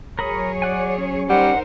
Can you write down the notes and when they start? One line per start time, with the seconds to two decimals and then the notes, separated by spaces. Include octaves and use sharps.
0.19 F#3 G#4 A#4 C#5 B5 D#6
0.62 D5 F#5 G#5
0.98 C#4
1.29 G3 D#4 A#4 C5 F#5